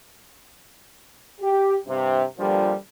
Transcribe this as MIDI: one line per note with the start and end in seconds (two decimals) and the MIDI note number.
1.41 1.76 67
1.87 2.23 43
1.87 2.23 48
2.38 2.74 43
2.38 2.74 46
2.38 2.74 50
2.38 2.74 53
2.38 2.74 55